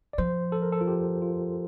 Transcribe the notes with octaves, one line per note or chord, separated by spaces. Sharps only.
D5
F3 C5
A4
A#4
A4
F4
G4
F4